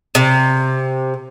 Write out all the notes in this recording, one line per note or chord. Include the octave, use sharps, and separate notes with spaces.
C3